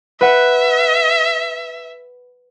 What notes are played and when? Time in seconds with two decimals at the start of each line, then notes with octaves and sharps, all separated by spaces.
0.21 B4 E5 F#5